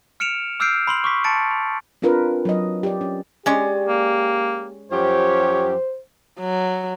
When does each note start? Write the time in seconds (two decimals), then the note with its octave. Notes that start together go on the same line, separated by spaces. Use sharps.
0.20 F6 C#7 D7 E7 F7
0.60 D6 E6 F6 G6 C7 D7
0.87 B5 C6 F#7
1.04 C#6 D6 B6
1.24 A5 B5 A6 C#7 D7
1.51 B5
2.02 C4 D4 F4 A#4 B4
2.45 F#3 D#5
2.83 G4 D5
3.01 C#4
3.46 G#3 C#4 G4 D5
3.89 A#3
4.92 F#2 F3 G4 C5 C#5
6.40 F#3